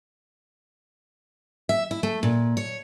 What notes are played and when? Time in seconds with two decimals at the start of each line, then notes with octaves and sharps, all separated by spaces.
1.69 E5
1.91 E4
2.03 A3
2.23 A#2
2.57 C#5